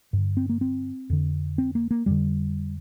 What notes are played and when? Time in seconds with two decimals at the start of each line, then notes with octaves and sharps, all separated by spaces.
0.13 G2 D3
0.37 C4
0.49 A#3
0.61 C4
1.10 F2 D3
1.58 C4
1.75 A#3
1.91 A#3
2.06 F2 D3 G3